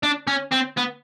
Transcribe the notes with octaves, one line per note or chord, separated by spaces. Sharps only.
D4
C#4
C4
B3